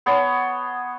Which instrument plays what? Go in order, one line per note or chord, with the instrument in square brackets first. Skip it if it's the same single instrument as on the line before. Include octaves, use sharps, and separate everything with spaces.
[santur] B3 C#5 A5 C6